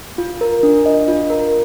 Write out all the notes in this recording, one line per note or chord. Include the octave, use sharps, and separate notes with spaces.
F4
A#4
D4
D#5
F4
A#4